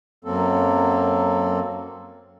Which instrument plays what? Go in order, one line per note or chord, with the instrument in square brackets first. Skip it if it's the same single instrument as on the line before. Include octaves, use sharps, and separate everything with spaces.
[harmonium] F#2 F#3 A#3 C4 A4